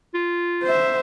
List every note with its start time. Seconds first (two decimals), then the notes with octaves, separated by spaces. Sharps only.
0.14 F4
0.63 C5 E5